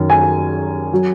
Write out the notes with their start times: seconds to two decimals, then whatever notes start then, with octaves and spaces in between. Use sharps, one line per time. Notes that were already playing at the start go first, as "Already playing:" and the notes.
Already playing: F#2 D#3
0.10 G#5
0.93 F#3